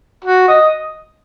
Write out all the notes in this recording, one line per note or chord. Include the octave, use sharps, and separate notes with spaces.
F#4
D#5